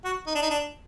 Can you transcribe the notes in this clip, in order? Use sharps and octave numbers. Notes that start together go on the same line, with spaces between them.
F#4
D#4
D4
D#4
D4